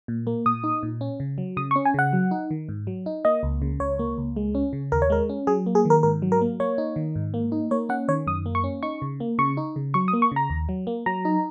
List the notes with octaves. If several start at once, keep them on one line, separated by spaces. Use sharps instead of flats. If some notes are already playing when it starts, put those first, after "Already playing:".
A#2
A#3
A#2 D#6
D#4
A#2
C#4
C#3
F#3
C#3 D#6
C#6
C#4
G#5
C#3 F#5
F#3
D#4
D#3
G#2
F#3
D#4
A#3 D#5
C#2
C#3
C#2 C#5
A#3
C#2
G#3
C#4
C#3
D#2 A#4
C#5
G#3 A#4
C#4
F#3 G#4
A#3
G#4
D#3 A#4
G#2 A#4
F#3
A#4
A#3
A#3 C#5
D#4
D#3
G#2
A#3
D#4
A#3 C#5
C#4 F#5
D#3 C#5
F#2 D#6
A#3
C#6
C#4
D#4 C#6
C#3
A#3
C#3 C#6
D#4
C#3
F#3 C#6
D#6
A#3
C#6
C#3 A#5
D#2
F#3
A#3
F#3 A#5
D#4